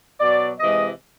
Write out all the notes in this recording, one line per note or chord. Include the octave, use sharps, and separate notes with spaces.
B2 F#3 D5
C3 E3 G#3 D#5